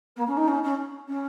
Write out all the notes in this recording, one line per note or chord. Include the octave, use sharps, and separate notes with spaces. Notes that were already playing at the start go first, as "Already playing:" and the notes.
A#3
C#4
D#4
C#4
C#4
C#4